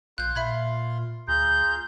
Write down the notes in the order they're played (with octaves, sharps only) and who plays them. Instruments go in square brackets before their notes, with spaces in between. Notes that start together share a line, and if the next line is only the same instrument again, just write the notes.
[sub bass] A#1 [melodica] F4 F5 C6 [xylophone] F#6 G6
[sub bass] A#2 [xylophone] E5 B5 G#6
[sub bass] D2 [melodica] F4 G#4 A#5 [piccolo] G6